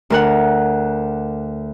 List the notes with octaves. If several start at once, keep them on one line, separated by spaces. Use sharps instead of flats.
D2 A#4 F#5